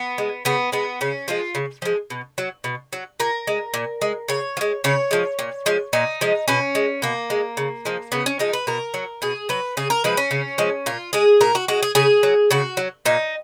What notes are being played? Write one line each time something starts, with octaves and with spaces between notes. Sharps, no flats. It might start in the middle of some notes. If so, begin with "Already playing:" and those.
Already playing: B3
G#3
C#3 B3
G#3 B3
C#3 C#4
F3 G#3 F4
C#3
F3 G#3
B2
F#3
B2
F#3
A#2 A#4
G#3
A#2
G#3
C#3 C#5
F3
G#3
C#3 C#5
F3 G#3
A#2
F3 G#3
A#2 D#4
F3 G#3
B2 C#4
G#3
B2 A#3
G#3
C#3
F3 G#3
C#3 B3
C#4
F3 G#3 D#4
B4
B2 A#4
F#3
B2 G#4
F#3 B4
C#3 G#4
A#4
F3 G#3 B4
C#4
C#3
F3 G#3
A#2 F4
G#3 G#4
A#2 A#4
F#4
G#3 F#4
G#4
C#3 G#4
F#3
C#3 F#4
F#3
A#2 D#4